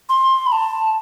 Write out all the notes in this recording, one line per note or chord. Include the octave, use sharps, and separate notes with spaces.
C6
B5
A5